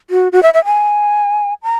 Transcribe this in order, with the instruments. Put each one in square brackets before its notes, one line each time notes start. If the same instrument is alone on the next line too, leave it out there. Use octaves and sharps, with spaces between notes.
[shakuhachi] F#4
F#4
E5
E5
G#5
A#5